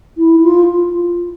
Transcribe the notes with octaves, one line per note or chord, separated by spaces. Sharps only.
E4
F4